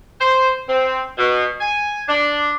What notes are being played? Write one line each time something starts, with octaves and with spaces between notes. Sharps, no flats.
C5
C4
B2
G#5
D4